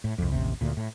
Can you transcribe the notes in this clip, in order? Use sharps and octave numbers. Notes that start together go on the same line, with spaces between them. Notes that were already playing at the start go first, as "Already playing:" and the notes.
A2
C2 F2
A1 D#2 C3
D2 A#2
A2